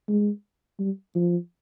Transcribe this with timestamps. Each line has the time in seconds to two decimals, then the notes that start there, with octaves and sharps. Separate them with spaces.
0.08 G#3
0.79 G3
1.15 F3